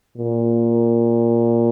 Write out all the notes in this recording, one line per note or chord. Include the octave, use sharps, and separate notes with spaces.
A#2